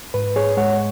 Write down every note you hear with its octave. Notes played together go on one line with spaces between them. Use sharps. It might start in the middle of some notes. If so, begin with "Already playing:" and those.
G#2 B4
G#4 C#5
G#3 C#5 F#5